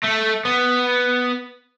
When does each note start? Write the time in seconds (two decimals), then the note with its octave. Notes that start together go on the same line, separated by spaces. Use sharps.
0.04 A3
0.45 B3